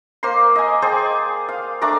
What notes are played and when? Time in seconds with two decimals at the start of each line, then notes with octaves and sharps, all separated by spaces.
0.23 A#3 C5 C6
0.56 D#5 G#5
0.82 G#4 C5 D5 G5
1.49 F5
1.81 A3 D4 A#5 D6